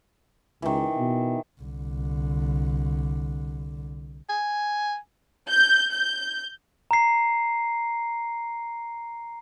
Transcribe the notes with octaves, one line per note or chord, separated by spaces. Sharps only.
C#2 D#3 E3
B2
C2 D3
G#5
G6
G6
A#5 C7